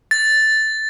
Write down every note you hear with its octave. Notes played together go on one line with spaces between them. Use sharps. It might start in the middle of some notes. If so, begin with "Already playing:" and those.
A6